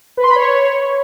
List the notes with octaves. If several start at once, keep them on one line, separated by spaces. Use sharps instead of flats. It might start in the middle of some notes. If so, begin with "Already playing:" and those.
B4
C6
B5
C#5